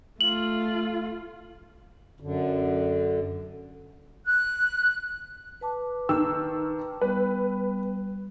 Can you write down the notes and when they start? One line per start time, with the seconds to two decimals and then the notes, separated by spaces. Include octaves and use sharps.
0.21 A3 F4 F#7
2.20 F#2 D3
4.26 F#6
5.61 B4 A5 D6
6.09 D#3 E6
7.01 G3 B3 B4